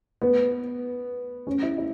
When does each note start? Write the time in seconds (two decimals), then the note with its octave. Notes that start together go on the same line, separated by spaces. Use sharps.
0.22 B3
1.47 C#4
1.63 E4
1.78 E4